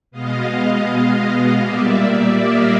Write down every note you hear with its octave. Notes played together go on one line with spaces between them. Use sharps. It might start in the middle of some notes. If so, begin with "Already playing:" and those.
B2 G#3 B3 D#5 F5
A#2 G3 A#3 D5 E5
D#5 F5